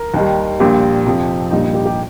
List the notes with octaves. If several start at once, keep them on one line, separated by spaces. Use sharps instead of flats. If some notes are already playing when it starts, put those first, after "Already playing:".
Already playing: A#4
D#2 D#3 G3
A#1 A#2 G3 G4
F2 C3 F3
A#1 A#2 G3 D#4
D#4
G4
G4